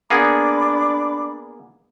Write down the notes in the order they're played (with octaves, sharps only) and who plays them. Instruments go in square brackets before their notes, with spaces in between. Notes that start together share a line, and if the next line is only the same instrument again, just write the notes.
[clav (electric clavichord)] A#3 B3 G#4 [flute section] D4 B5 D6